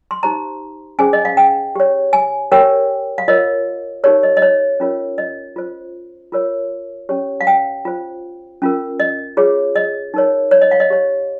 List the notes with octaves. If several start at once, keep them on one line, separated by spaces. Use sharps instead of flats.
C6
D#4 G4 C5 A#5
C#4 G#4 C5 G#5
D#5
F5
G5
G4 C#5
G#5
G4 A#4 C#5 G5
F5
F4 A#4 C#5 D#5
D#4 G4 A#4 C#5
D#5
D#5
C#5
C#4 F4 A#4 C#5
D#5
F4 C5
F4 A#4 C#5
C#4 G4 C#5
F5
G5
F4 C5
C#4 F4 A#4
D#5
F4 G#4 C#5
D#5
D#4 A#4 C#5
C#5
D#5
F5
D#5
G4 C#5